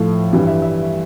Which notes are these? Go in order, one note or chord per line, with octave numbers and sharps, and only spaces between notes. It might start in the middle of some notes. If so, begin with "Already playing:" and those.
Already playing: A2 F3 A3 F5
G2 E3 G3
E5
E5